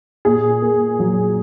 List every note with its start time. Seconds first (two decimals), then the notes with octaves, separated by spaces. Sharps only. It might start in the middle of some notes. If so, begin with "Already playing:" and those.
0.25 A#2 G#4
0.62 A#3
0.99 F#3